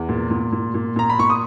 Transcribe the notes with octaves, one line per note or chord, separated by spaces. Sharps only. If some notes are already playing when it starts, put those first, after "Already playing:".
Already playing: E2
A#2
A#2
A#2
A#2
A#2 A#5
B5
A#2 C#6
D#6